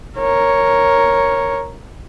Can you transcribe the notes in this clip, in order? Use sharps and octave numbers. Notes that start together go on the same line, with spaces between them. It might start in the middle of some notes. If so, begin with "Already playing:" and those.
A#4 C#5